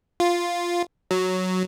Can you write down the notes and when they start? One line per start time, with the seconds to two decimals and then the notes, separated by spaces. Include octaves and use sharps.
0.20 F4
1.11 F#3